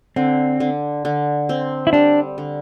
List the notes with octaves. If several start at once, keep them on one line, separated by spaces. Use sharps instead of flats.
D3 C4
D3
D3
C4
E4
G3 D4
D3